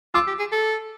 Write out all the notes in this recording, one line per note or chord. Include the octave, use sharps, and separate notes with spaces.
F4 D6 E6
G4
G#4
A4